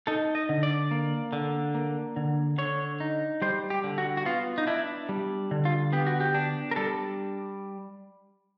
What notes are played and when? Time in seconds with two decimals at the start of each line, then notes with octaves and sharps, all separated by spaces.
0.07 D#4 A4
0.35 D#5
0.49 D3
0.63 D5
0.91 A#3
1.33 D3
1.75 A#3
2.16 D3
2.58 D3 C#5
3.00 D#4
3.42 G3 C5
3.70 G4
3.84 D3
3.98 F#4
4.17 F#4
4.25 B3 F4
4.58 D#4
4.67 D4 E4
5.09 G3
5.51 D3
5.65 F4
5.93 B3 G4
6.06 F#4
6.20 G4
6.34 D4
6.71 A#4
6.76 G3 A4